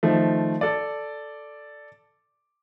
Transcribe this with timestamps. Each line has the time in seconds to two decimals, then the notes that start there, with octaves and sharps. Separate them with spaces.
0.03 D#3 F3 A3
0.61 A4 D5